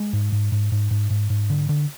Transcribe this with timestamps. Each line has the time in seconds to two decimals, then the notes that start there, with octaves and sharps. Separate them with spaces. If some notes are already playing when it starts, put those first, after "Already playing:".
Already playing: G#3
0.13 G#2
0.32 G#2
0.52 G#2
0.72 G#2
0.91 G#2
1.10 G#2
1.30 G#2
1.50 D3
1.69 D3